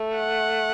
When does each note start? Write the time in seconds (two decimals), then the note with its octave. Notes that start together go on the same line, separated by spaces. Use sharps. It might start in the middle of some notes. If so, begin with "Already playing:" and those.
Already playing: A3
0.16 F#5